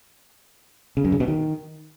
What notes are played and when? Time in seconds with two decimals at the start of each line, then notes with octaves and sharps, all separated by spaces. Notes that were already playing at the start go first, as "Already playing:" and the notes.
0.97 C#3
1.05 F#2
1.12 C#3
1.20 B2
1.28 D#3